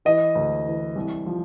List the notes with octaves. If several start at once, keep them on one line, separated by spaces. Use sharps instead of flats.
E3 D#5
D2
E3
C2
F3